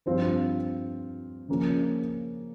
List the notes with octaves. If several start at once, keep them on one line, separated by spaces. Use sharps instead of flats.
G2 F3 C4 F4
C#3 F3 A#3 C#4